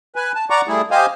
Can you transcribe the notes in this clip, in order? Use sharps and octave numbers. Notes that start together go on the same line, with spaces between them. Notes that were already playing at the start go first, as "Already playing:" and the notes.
B4 G#5
A5
D5 F#5 A#5 C#6 D6
G3 A3 E4 G#4
G4 C5 D#5 F5 G#5